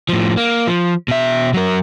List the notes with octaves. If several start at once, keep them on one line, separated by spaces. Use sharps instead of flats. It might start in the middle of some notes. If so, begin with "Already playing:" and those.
A2 F3
A#3
F3
B2 E5
F#3 A#4